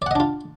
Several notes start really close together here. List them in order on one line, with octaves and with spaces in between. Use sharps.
D5 F#5 D#5 D4 F4